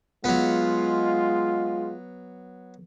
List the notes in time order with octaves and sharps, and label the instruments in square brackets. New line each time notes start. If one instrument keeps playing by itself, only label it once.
[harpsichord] F#3 B3 [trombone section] G#3 F4